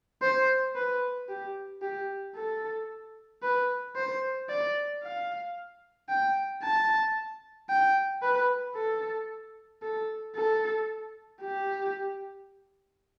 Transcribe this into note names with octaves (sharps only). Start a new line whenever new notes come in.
C5
B4
G4
G4
A4
B4
C5
D5
F5
G5
A5
G5
B4
A4
A4
A4
G4